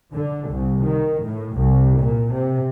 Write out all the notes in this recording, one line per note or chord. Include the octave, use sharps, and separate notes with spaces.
D3
C2
D#3
A2
C2
A#2
C3